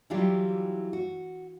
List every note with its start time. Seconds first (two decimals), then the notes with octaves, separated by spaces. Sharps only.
0.10 E3 F#3 G3 E4 F4 G4
0.93 F#4